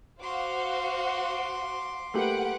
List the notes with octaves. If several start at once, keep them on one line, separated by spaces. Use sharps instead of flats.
F#4 C5 F5 C6 D6
A3 A#3 G4 B4 F#5 D7